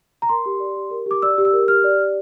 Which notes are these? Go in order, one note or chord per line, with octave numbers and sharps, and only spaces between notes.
A#5
A#4 C6
G4
D5
G4
A#4
G4 D6
D5 E6
G4
E6
A#4
G4 F6
D5
G4